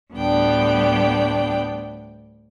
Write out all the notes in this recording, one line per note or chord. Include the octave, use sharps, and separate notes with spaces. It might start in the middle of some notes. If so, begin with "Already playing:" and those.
D2 A2 G3 B3 D4 G5